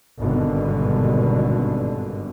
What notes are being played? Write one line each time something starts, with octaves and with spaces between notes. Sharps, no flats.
G#1 G2 B2 D3